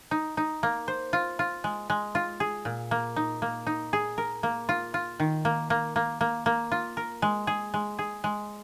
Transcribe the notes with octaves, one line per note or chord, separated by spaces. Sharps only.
D#4
D#4
A#3
C5
F4
F4
G#3
G#3
F4
G#4
A#2
A#3
D#4
A#3
D#4
G#4
A#4
A#3
F4
F4
D#3
A#3
A#3
A#3
A#3
A#3
F4
A#4
G#3
G#4
G#3
G#4
G#3